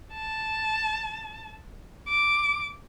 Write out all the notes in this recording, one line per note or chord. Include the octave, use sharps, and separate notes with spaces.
A5
D6